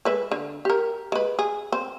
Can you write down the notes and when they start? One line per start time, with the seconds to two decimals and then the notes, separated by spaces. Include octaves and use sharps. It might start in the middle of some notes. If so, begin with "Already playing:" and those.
0.05 G#3 B4 E5
0.31 D3
0.65 G4 A#4
1.12 G#3 B4
1.39 G#4
1.72 C4